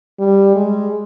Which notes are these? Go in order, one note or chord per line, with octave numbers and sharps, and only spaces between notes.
G3
G#3